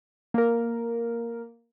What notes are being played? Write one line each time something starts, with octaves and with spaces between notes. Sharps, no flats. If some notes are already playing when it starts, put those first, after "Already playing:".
A#3 A#4